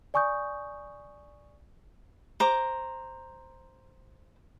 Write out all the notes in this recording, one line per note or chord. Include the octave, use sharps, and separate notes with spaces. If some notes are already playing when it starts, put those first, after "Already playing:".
D5 G#5 C#6 D#6 G6
C5 A#5 D6